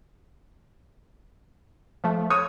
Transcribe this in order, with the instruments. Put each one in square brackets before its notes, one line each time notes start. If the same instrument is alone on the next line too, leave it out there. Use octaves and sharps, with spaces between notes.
[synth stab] F3 A3
[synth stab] C#5 [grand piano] D#6